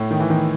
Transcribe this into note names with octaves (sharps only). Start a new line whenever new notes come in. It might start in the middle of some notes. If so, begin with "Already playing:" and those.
Already playing: A2
D#3
E3
D#3